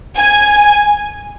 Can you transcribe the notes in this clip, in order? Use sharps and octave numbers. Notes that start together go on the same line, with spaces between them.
G#5